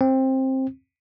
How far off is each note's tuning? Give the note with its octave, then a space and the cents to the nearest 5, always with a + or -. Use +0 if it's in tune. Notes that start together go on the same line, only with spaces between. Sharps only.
C4 +15